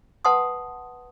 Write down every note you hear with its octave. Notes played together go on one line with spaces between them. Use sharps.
B4 F#5 A5 C6 D#6